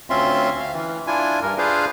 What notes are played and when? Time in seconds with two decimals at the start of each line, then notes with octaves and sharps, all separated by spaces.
0.10 D2 C4 C#4 F4 E5 C6
0.59 F5
0.74 E3
1.07 D4 E4 F4 G#5
1.42 G2 A#4
1.58 D4 F4 G#4 B4 C5 F5